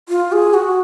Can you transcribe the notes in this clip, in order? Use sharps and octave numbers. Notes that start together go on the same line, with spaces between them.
F4
G#4
F#4